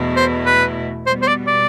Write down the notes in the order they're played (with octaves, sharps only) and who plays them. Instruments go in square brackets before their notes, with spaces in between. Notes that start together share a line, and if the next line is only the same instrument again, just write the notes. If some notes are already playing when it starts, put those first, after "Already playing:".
Already playing: [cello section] E2 B2 A3 E4
[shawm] C5
B4
[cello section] B2 G3 B3 [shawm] C5
[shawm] C5
D5
D5